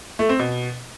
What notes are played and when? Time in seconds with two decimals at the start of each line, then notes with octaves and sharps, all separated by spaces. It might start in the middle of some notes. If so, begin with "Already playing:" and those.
0.19 A3
0.29 C4
0.39 B2